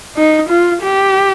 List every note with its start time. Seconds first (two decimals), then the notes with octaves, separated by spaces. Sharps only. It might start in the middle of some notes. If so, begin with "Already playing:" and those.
0.16 D#4
0.49 F4
0.82 G4